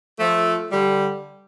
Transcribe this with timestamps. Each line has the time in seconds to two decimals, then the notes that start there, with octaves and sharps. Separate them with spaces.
0.19 F3 A3
0.71 D3 G3